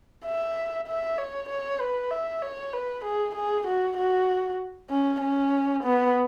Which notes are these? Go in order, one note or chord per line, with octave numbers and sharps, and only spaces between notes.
E5
E5
C#5
C#5
B4
E5
C#5
B4
G#4
G#4
F#4
F#4
C#4
C#4
B3